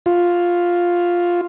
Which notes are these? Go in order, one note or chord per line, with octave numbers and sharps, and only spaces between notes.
F4